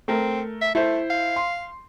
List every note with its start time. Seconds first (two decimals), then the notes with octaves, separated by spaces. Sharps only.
0.08 A3 C4 A#4
0.61 E5
0.75 A3 E4 C5
1.10 F5
1.36 C6